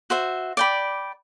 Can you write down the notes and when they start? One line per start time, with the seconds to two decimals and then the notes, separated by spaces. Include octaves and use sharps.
0.10 F#4 C5 E5
0.57 D5 G5 B5